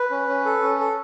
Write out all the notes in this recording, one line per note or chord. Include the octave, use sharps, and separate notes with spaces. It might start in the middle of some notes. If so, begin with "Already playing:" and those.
Already playing: B4
C#4
C#4
A4
C#4
A4